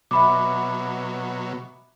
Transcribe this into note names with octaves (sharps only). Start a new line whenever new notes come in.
B2 F#3 E5 B5 D6